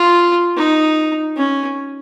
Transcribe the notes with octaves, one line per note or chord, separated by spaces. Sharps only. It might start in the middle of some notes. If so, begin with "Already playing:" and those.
Already playing: F4
D#4
C#4